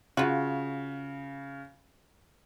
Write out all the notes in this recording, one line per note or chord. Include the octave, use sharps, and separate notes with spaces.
C#3 F4 F#4